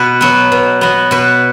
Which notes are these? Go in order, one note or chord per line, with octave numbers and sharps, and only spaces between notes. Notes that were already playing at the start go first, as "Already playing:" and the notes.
Already playing: B2 F#4 B4
F#3 B3
B2
F#3 B3
B2 B4